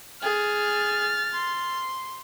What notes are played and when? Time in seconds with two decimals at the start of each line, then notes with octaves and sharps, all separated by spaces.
0.22 G#4 F6 A6
1.33 C6